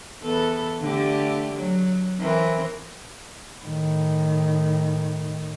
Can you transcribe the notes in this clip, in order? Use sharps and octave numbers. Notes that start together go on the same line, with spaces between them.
E2 B3 A4
D3 A3 G4
F#3
E3 C4 A#4
A2 D#3